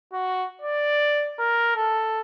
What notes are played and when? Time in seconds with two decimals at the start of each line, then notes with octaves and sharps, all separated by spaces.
0.13 F#4
0.62 D5
1.40 A#4
1.76 A4